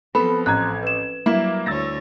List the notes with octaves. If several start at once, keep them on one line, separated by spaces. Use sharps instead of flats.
F3 B3 C4 A4 B5
A1 A#5 F#6 G#6
B4 E7
F#3 G3 A#3 E4
D2 C#5 E6 A6 A#6